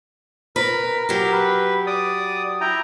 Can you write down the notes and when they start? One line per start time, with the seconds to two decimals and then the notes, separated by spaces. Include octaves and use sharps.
0.56 A#4 B4
1.09 F#3 G4 A#4
1.33 B4
1.87 D5 D#6
2.61 E4 G5 A#5